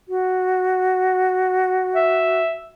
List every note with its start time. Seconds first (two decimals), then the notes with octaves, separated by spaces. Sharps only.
0.08 F#4
1.96 E5